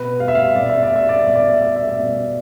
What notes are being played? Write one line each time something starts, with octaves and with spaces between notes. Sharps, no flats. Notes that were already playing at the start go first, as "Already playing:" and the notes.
Already playing: B2 B4
G3 F5
E5
F5
B2 D5
E5
D5
G3 E5
D5
E5
B2
D5
E5
G3 D5
E5
D5
B2